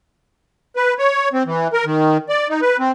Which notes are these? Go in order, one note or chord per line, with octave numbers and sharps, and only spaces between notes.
B4
C#5
C4
E3
A#4
D#3
D5
D#4
B4
C4